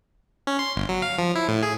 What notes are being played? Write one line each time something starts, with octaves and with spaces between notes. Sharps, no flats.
C#4
C6
G1
F#3
F5
F3
E4
A2
G#4